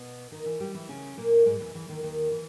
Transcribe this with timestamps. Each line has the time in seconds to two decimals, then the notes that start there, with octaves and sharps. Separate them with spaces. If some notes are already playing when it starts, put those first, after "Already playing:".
Already playing: B2 B3
0.32 D#3 D#4
0.46 E3 E4
0.60 G3 G4
0.74 E3 E4
0.89 C#3 C#4
1.17 A#2 A#3
1.46 G#2 G#3
1.60 E2 E3
1.74 E2 E3
1.88 D#2 D#3
2.03 D#2 D#3
2.31 E3